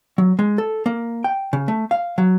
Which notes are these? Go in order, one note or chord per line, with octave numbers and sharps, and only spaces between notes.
F#3
G#3
A4
A#3
G5
C#3
A3
F5
F#3